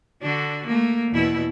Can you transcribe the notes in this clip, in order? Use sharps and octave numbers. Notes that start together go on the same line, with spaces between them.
D3 D4 F#4
A3 A#3
E2 B2 E4